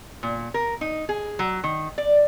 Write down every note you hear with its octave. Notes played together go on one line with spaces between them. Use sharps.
A#2
A#4
D#4
G#4
F#3
D#3
D5